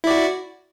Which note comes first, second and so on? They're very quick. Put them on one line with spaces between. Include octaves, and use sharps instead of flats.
E4 D5 F#4